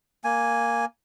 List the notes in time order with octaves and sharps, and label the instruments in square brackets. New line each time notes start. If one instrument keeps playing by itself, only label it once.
[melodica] A#3 G#5